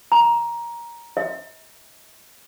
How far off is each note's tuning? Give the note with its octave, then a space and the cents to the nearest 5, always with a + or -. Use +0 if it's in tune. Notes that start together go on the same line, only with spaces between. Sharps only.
A#5 +15
D#5 +40